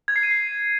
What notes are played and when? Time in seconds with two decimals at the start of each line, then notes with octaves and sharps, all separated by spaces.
0.08 G#6
0.16 C7
0.23 D#7
0.31 C7